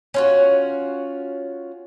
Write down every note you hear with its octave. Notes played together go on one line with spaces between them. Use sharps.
C#4 F4 F#4